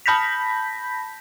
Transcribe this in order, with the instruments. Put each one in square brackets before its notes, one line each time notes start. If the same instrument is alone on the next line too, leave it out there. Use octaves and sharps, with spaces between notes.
[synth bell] A5 B5 G6 A#6 B6